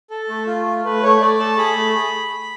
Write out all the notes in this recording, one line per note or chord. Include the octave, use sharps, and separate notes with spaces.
A4
A3
F4
A3
A3 B4
A3 C#5
A3 D5
A4 A5
G#4 B5
A3
G#4